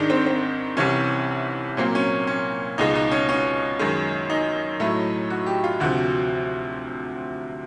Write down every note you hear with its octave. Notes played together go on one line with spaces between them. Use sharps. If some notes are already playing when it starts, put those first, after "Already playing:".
Already playing: G#2 D#3 G#3 D4 D#4
C4
C4
C2 C3 E3 C#4
A#2 F#3 A#3 C4
C#4
C#4
C#2 B2 G#3 D#4
D#4
C#4
C#4
F#2 D#3 G#3
D#4
A2 F#3 A3
F#4
G4
F4
D2 C3 F3 F#4